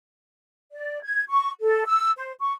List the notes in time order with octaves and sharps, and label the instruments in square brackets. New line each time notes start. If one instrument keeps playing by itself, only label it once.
[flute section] D5
G#6
C#6
A4
E6
C5
C#6